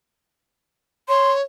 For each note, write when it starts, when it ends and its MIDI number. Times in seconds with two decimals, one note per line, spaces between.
1.09 1.42 73
1.09 1.32 84